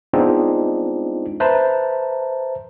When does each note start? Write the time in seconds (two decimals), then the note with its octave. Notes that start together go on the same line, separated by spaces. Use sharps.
0.13 G#3 B3 C4 D4 D#4 F4
1.40 B4 C5 E5 A5 A#5